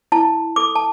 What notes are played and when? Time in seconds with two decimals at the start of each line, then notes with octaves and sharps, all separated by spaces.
0.12 E4 A5
0.56 A4 D6
0.75 A5